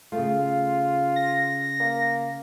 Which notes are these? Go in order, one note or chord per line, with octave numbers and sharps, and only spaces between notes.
C#3 A3 F4
A#6
A#3